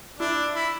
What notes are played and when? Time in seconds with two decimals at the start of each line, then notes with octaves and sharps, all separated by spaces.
0.19 D4 E4
0.55 E4